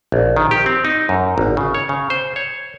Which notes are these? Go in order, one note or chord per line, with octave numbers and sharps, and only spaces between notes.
A#1
D#3
G4
C4
D#4
F#2
G#1
C#3
C#5
C#3
C5
C#5